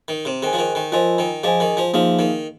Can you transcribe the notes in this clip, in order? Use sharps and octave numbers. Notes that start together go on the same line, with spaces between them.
D#3
C3
D#3 G#4 C5 G#5
F3
D#3
D#3
F3 F4 A#4 D#5 G#5
D#3
F3 G#4 D#5 G#5
D#3
F3
F3 A#3 D#4 G#4 F5
D#3